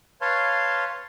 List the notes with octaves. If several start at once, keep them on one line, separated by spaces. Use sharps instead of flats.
B4 C#5 F5 A5 C6